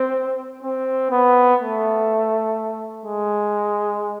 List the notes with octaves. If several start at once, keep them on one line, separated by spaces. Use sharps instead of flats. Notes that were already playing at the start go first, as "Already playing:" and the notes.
Already playing: C4
C4
B3
A3
G#3